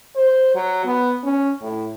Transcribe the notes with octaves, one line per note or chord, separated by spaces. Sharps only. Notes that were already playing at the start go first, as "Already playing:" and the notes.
C5
F#3
B3
C#4
A2